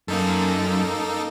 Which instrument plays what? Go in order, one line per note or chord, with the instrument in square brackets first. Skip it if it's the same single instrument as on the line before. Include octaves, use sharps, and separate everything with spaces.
[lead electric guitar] F#2 [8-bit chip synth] A#3 D#4 A4